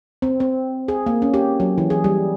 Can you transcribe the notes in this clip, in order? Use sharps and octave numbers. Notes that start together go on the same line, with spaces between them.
C4
C4
G#4
A#3
C#4
G4
F#3
E3
G#4
G3